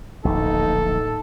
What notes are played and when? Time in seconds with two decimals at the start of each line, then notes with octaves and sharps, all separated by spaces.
0.25 D1 A#1 D#4 A4